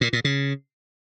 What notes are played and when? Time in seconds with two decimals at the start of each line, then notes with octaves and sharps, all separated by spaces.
0.01 A#2
0.13 A#2
0.24 C#3